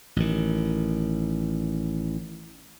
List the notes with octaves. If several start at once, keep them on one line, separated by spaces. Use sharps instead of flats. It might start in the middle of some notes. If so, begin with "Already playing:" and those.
A1 D#3